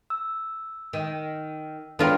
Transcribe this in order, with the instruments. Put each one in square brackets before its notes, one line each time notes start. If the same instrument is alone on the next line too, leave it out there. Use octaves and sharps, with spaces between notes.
[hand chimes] E6
[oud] D#3
[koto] B3 F4 A#4 [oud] D4 [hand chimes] A4 C#5 G5